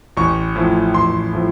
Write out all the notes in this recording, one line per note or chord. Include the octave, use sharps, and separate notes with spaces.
A1 C#6
A2 F3
A1 C6
A2 F3